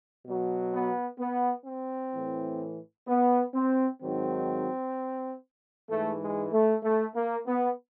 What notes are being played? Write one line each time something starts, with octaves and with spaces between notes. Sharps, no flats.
B2 F#3
B3
B3
C4
A2 E3
B3
C4
G#2 D#3 F#3 C4
G#2 E3 A3
G#3
A3
A3
A#3
B3